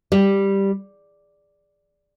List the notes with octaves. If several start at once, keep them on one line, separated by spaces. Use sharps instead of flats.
G3